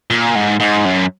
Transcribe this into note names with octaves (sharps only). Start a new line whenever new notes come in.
A#2
G#2
G#2
F#2